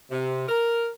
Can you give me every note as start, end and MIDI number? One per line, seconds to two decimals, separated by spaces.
0.11 0.46 48
0.49 0.89 70